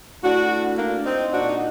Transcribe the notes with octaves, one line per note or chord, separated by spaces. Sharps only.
A2 D4 F#4
A#3 D4
C4 D#4
A#2 D4 F#4
D#4